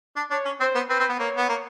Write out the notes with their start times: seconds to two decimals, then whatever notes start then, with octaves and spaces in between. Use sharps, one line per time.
0.16 D4
0.30 D4 C#5
0.45 C#4
0.60 C4 C5
0.75 B3
0.89 C4 B4
0.99 C4
1.09 B3
1.19 A#3 C#5
1.37 B3
1.49 A#3